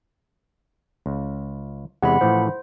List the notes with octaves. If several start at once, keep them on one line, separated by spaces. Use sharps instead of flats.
C#2
E2 C3 G#3 F#5 B5
A2 E3 F3 C5